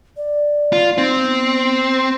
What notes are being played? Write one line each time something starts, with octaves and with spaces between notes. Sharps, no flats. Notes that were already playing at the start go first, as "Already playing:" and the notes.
D5
F4
C4 D#4
B3